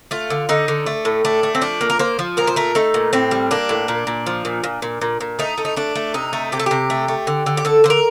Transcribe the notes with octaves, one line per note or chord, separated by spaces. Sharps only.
A3 F4
D3
D3 D#4
D3
A3
A2
A3 D4
A3
C4
F3 D4
A#3
A#4
A#3 C5
F3
A#2 A#4
C5
A3 A#4
A3 D#4
A#2
A2 C4
G3
A#3 D4
A2
A#2
A#2
F3
A#2
A#2
A#2
A#2
A#2
A3 D#4
A3
D#4
A3 D4
A3
C3 D#4
A3
C3 G4
A4
C3 G4
A3
A3
D3
D3
G4
D3 A4
D3 C5
A#4